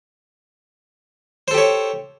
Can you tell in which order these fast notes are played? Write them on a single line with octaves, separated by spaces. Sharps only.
C5 A4 G4 C#5